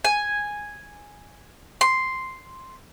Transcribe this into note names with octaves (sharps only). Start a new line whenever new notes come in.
G#5
C6